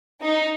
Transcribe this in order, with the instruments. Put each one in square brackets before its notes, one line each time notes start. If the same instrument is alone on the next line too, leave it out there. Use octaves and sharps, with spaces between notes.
[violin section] D#4